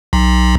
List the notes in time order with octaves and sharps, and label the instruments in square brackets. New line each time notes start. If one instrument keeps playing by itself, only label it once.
[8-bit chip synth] B1